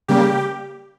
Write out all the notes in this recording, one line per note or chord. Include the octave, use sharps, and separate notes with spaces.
C#3 G3 A#3 G4